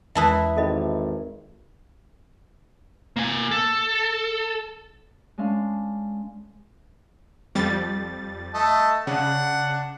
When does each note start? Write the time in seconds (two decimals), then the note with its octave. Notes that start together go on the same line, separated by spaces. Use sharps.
0.15 E2 E3 G#3 E4 B4 E5 A5 D#6
0.57 G#1 A4 D#5 E5 G5 B5
3.17 A#3 G#5
3.51 A4
5.38 G#3 C#4 D4 F5
7.55 F2 G3 A6
8.54 A3 D#5 A5
9.07 C#3 D4 F#5